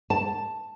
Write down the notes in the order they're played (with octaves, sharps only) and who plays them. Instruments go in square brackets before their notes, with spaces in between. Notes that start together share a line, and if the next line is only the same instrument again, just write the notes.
[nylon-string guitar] A5